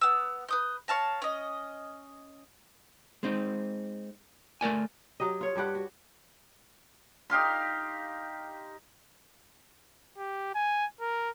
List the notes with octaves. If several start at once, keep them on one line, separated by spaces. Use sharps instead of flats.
B3 E6
B4 D#6 G6
C#5 F5 A5 A#5
C#4 D#5
G#3 C4 D#4
A3 A#4 D5 G#5
F#3 G4 D#5
F4 C#5
G2 G3 G4 F#5
F#4
D#4 G4 F5 C6
G4
G#5
A#4